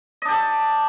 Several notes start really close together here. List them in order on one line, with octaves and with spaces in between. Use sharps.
D#5 D4 G4 A4